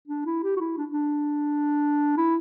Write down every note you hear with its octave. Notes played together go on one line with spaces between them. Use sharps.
D4
E4
G4
F#4
E4
D4
D4
E4